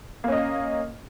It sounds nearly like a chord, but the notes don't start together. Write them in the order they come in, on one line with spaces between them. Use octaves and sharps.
A#3 C#4 D#5